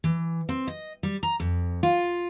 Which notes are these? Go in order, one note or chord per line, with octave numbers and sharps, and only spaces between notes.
E3
C4
D#5
G3
A#5
F2
F4